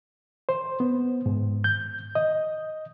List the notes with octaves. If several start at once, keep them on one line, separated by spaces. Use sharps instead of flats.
C5
B3
G#2
G6
D#5